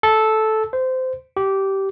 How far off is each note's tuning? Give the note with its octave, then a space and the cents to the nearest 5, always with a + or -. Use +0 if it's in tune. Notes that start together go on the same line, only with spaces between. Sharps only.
A4 -10
C5 -20
G4 -15